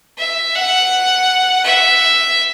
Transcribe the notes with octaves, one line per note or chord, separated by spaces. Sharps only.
E5
F#5
E5